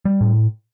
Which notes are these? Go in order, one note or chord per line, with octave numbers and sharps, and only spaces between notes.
G3
A2